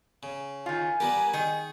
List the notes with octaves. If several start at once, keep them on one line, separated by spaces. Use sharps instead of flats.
C#3
D#3 F4 G#5
G3 B3 G4 A#4
D#3 G#4